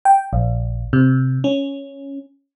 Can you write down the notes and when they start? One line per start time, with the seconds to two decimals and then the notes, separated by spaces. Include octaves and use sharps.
0.05 G5
0.33 A#1
0.93 C3
1.44 C#4